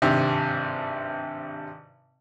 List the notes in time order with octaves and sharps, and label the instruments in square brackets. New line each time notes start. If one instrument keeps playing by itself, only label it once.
[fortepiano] G#1 G2 C3